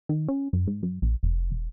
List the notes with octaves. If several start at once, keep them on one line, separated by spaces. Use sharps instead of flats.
D#3
C#4
F#2
G#2
F#2
A#1
F1
E1